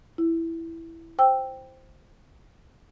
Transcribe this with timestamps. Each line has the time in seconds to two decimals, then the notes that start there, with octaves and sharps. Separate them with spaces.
0.18 E4
1.18 C5 G5 E6